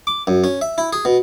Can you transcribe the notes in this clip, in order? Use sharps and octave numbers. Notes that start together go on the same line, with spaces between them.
D6
F#2
C#4
E5
E4
G#4
B2